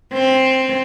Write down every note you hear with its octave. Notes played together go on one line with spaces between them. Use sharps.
C4